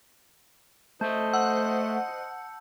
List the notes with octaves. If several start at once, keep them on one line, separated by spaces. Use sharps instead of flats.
A3 C5 D#5 A5 G6
F#5 E6